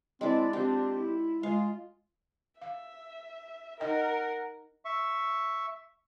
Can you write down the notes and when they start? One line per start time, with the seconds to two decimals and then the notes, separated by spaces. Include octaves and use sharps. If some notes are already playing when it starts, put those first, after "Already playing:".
0.21 G#3 C4 D4 E4 D5 D6
0.53 C4 D4 F4 G4
0.94 E4
1.43 G#3 F4 F5
2.62 E5 F5
3.80 D#4 A#4 D#5 F#5 G5
4.85 E5 C#6